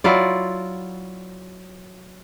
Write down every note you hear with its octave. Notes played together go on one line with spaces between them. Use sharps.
F#3 E4 F4 D5